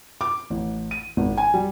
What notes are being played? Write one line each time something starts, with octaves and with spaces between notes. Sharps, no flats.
D6
A1
D#7
G#1
G#5
G3